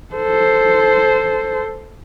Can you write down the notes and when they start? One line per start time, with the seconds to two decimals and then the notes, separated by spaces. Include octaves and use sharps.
0.14 A4 C5